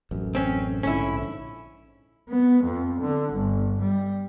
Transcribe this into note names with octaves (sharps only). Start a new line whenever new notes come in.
A1 F#2
C4 C#4
A#1 G#2 D3 C#4 E4
B3
F2
D3
G1
G3